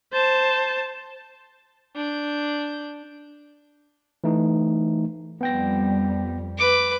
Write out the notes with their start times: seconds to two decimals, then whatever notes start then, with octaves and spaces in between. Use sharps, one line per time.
0.13 C5 A5
1.95 D4 G6
4.24 E3 A3 D#4
5.41 F2 G3 B3 G5 A#6
6.58 B4 D6